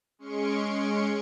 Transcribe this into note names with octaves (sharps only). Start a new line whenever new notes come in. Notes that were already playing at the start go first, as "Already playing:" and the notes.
G#3 C#4 C6 C#6 C#7 D7